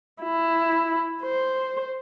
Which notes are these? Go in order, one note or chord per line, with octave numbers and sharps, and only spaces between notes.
E4
C5